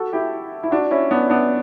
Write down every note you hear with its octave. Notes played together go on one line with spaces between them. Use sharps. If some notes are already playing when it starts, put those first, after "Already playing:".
Already playing: F#4 A4
E4 G4
E4
D4 F#4
C#4 E4
B3 D4
B3 D4